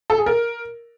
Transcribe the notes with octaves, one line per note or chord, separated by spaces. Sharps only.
A4
G#4
A#4